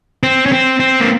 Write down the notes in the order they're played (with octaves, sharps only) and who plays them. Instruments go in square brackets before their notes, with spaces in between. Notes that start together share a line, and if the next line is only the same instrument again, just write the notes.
[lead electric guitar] C4
C#4
C4
C4
A#3